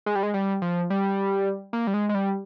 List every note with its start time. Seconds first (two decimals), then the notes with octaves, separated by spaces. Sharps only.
0.06 G#3
0.15 G3
0.23 G#3
0.34 G3
0.62 F3
0.90 G3
1.73 A#3
1.87 G3
1.94 G#3
2.09 G#3
2.15 G3